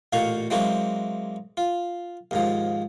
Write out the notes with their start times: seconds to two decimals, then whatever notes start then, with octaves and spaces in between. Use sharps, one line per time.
0.13 A1 A#2 D#4 F5 F#5 C#6
0.50 E3 F#3 G#3 A#3 C4 F#4
1.57 F4
2.31 D#2 G#2 F3